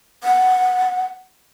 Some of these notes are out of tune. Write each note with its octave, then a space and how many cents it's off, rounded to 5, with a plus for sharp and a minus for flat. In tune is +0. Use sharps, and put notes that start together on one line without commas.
F#5 +5